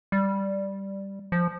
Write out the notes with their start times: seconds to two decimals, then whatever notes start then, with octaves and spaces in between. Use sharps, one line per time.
0.12 G3
1.32 F3